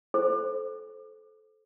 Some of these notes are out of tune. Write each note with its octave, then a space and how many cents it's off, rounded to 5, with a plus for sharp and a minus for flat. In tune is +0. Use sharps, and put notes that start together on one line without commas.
A4 -20 C5 +0